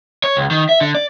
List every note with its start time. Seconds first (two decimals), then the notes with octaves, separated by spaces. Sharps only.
0.24 C#5
0.36 C#2
0.51 D#3
0.69 E5
0.81 D3
0.95 D5